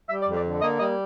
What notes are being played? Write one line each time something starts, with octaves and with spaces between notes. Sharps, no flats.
G3 E5
D5
F2
D5
D3
A#3 D#5
G3 D#5